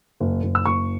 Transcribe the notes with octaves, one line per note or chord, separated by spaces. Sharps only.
F#1
F#1
E6
F#1 C#6